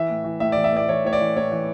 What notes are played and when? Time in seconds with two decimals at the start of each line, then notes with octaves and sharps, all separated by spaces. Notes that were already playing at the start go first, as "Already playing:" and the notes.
Already playing: E3 E5
0.09 A2
0.24 E3
0.40 A2 E5
0.52 E3 D5
0.64 E5
0.72 A2 D5
0.88 E3 C#5
1.05 A2 C#5
1.13 D5
1.21 E3
1.36 A2 C#5
1.52 E3